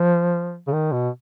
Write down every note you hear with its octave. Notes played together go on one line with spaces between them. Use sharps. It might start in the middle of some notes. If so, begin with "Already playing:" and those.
Already playing: F3
C#3
D#3
B2